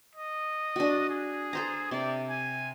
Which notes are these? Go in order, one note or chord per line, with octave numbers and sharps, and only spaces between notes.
D#5
D4 F#4
G#4
A4 C5 A#5
C3 D5
G#5